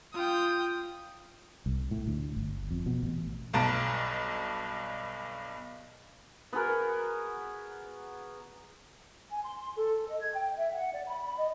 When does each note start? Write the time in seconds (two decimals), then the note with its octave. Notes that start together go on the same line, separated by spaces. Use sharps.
0.14 F4 G5 D#6
1.66 C2
1.91 A2
2.07 D2
2.37 G1
2.71 F2
2.86 B2
3.03 A1
3.53 B1 G2 B2 A5 A#5 D7
6.53 B3 F#4 G#4 A#4
9.31 G#5
9.43 C6
9.60 C6
9.76 A4
10.08 D#5
10.20 G#6
10.35 G5
10.57 E5
10.74 F#5
10.92 D5
11.07 B5
11.38 D#5